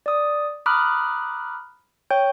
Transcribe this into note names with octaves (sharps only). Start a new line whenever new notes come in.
D5 D#6
A#5 B5 D6 D#6 F6 F#6
C#5 G5 G6